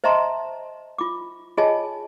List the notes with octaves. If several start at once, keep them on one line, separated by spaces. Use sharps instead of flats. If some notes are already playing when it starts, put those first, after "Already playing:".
C5 D#5 E5 A5 A#5 C6
F4 D6
F4 G#4 C#5 D#5 G#5 A5